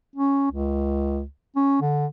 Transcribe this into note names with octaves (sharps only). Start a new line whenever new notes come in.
C#4
C#2
C#4
D3